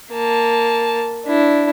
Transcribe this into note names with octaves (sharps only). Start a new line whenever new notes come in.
A#3 A5
D4 E4